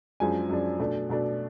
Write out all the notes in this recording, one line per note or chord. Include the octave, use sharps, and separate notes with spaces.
F#2 F3 G#3 D4 G#5
F#2 F3 G#3 D4
B2 A3 D4
B2 A3 D4